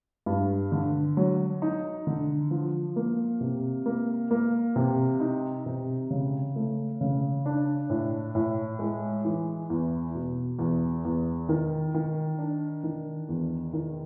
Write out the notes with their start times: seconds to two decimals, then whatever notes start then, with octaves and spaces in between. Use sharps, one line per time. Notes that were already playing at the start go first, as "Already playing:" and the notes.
0.26 G2
0.72 D3
1.17 F#3
1.62 D#4
2.07 D3
2.51 F3
2.96 A#3
3.41 C3
3.86 A#3
4.31 A#3
4.76 C3
5.20 D#4
5.66 C3
6.10 C#3
6.56 A3
7.01 C#3
7.46 D4
7.90 A2
8.35 A2
8.79 G#3
9.25 E3
9.70 E2
10.15 B2
10.59 E2
11.05 E2
11.49 D#3
11.94 D#3
12.39 D4
12.84 D#3
13.29 E2
13.73 D#3